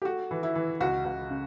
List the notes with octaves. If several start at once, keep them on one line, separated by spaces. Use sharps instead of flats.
G4
A3 F#4
E3
E4
E3
C#2 F#4
C#2
C#3